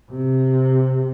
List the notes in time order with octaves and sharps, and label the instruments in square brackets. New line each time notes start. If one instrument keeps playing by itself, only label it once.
[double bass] C3